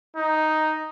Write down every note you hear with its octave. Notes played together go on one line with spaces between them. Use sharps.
D#4